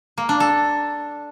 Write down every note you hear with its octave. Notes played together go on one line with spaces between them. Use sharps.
A#3
D4
A4